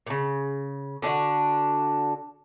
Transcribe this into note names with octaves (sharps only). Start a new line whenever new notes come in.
A#2 C#3
D3 D4 F4 F#4